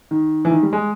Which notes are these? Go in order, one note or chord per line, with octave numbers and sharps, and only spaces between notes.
D#3
E3
D#3
G3
G#3